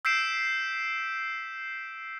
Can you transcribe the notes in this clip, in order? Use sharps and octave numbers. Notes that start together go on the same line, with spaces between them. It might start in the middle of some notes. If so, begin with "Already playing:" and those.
E6 G6 B6 C7 D7 E7